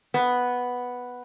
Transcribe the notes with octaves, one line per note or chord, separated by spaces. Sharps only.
B3